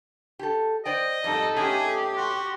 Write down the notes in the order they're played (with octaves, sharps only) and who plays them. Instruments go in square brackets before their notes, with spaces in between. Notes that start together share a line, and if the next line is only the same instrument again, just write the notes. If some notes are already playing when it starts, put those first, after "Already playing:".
[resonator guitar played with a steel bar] G4 A4
[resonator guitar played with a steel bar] C5 D5 G5 [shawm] D#5
[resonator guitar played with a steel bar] F2 G#2 G3 [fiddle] D#4 A4
[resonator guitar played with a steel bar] A3 B3 C#4 [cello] G4 [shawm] G#4
[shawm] F#4 [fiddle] C6